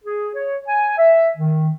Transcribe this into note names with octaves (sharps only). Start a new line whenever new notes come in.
G#4
C#5
G#5
E5
D#3